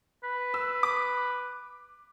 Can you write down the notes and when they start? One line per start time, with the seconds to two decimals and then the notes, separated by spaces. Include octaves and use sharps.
0.24 B4
0.54 E6
0.83 D6